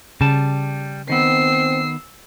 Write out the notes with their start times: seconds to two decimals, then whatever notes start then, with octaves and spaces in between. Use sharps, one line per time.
0.21 C#3 G3 A5
1.09 D#3 B3 C4 E6 C7